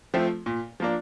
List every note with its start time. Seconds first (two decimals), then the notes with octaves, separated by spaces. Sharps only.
0.14 F3 A3 C4
0.46 A#2
0.80 F3 A#3 D4